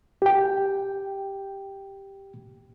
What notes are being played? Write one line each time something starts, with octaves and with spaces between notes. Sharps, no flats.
G4 G5